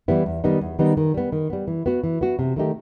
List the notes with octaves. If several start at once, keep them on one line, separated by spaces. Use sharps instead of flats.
E3 G3 B3 E4
E2
D#3 G3 B3 D#4
E2
D#3 G3 B3 D#4
D#3
G3 B3
D#3
G3 B3
E3
B3 F#4
E3
B3 F#4
C3
D#3 A3 D#4 G4